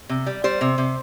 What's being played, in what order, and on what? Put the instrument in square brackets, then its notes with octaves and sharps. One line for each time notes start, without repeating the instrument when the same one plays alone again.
[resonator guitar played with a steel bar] C3
G3
G3 C5
C3
C3